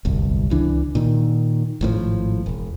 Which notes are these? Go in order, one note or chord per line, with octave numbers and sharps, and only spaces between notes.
D1 G1 C2
C#2 E3 D4
A#2 D#3
G#1 A2 D3 F3
E1